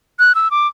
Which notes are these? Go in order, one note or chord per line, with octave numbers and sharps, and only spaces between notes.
F#6
E6
D6